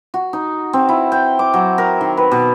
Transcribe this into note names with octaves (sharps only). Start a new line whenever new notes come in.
F#4
D#4
C4
E4
G5
D6
F#3
A#4
D#3
B4
B2